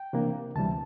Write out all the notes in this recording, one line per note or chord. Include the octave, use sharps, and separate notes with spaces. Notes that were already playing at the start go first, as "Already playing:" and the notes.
Already playing: G5
C3 E3 A#3 D4
D2 C3 E3 G3 A5